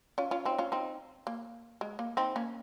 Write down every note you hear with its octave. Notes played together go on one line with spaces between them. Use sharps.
C#4 F4
C#4 F4
C4 D#4
C#4 F4
C4 D#4
A#3
G#3
A#3
C4 D#4
A#3 C#4